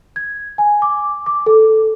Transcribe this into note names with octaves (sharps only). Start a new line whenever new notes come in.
G#6
G#5
D6
D6
A4